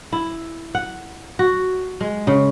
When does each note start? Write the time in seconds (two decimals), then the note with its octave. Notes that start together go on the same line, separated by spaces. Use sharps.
0.12 E4
0.75 F#5
1.39 F#4
2.01 G#3
2.27 C#3